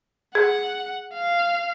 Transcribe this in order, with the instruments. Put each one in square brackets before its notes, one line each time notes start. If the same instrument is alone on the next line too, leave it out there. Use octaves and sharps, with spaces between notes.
[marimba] G#4 [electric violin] F#5
[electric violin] F5